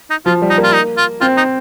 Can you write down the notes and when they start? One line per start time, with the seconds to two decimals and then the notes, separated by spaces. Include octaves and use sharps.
0.10 D#4
0.26 F3 F4
0.42 G3
0.50 D#4
0.58 A#3
0.63 F4
0.73 D#4
0.97 F4
1.21 C4 F4
1.37 D#4